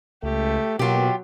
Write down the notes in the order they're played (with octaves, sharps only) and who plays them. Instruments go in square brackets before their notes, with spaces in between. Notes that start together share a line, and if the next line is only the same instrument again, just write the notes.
[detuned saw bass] C#2 [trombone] A3 [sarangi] G4
[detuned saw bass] B2 [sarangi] F#3 [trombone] A#3 [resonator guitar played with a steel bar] F4 G4